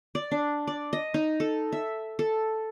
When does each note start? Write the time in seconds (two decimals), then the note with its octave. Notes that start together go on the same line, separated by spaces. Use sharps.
0.15 D5
0.31 D4
0.67 D5
0.93 D#5
1.14 D#4
1.40 A4
1.72 E5
2.19 A4